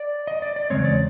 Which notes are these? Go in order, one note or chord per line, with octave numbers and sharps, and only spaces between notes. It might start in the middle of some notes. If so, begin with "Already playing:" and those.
Already playing: D5
D#5
D5
D5
E2 C#3 F3 G#3 C4 C#5
D5